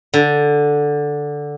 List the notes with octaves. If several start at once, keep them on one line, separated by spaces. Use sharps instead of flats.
D3